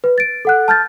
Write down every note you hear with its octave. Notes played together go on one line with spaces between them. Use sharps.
B4
A6 D7
A4 F#5 F#6
A5 F6 G6 A6